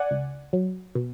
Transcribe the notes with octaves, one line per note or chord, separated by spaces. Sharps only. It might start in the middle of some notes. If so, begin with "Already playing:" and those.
Already playing: D5 F#5 G#5
C#2
F#3
B2